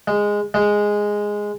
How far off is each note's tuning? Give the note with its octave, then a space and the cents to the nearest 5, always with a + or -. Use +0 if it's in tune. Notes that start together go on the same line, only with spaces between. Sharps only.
G#3 -10
G#3 -5